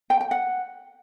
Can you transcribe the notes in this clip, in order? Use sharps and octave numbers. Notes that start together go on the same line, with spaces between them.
G5
G5
F#5